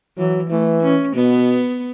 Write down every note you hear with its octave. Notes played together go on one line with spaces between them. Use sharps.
E3 F#3
E3 A3
C#4
B2 B3